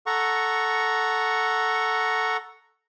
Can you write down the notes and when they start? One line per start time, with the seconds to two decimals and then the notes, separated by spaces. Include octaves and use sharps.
0.06 A4 F#5 A#5 C#6